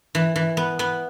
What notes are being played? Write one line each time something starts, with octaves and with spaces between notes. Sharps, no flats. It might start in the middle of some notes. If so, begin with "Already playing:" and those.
E3
E3
B3
B3